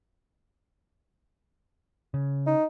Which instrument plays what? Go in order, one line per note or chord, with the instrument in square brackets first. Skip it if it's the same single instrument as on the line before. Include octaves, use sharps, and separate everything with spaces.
[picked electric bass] C#3
[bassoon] D#4